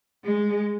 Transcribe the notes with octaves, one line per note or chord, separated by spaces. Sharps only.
G#3